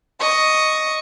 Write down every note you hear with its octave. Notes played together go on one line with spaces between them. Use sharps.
D#5 C#6